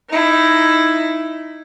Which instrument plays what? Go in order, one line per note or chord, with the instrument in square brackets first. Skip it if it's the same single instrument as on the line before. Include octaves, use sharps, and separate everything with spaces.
[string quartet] D#4 E4